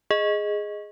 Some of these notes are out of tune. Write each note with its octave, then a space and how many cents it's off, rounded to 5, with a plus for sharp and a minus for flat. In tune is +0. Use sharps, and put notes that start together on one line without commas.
G#4 +0 D#5 +0